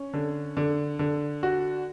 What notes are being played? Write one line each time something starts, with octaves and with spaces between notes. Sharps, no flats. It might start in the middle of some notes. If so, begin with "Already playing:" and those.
Already playing: C#4
D3
D3
D3
F#4